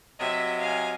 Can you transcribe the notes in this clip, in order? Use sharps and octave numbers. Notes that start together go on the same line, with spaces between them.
C3 F#3 D#5 E5
F5 G#5